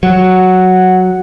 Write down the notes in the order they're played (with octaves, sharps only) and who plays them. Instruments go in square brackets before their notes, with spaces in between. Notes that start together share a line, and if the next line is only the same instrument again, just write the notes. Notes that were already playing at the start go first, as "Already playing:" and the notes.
[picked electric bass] F#3 [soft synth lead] F#5